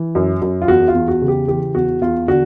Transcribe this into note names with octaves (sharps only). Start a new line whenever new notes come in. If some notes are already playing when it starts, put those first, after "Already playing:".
Already playing: E3
F#2
F#2
F4
E2 F#4
F4
E2
F#4
C#3
G4
E3 G4
E2 F#4
E2 F4
D3 F#4